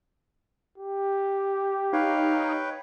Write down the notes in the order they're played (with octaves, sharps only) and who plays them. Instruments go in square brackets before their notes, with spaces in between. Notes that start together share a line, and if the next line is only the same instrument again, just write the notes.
[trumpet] G4
[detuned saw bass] D#4 [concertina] B4 C#5 G5 [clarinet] F5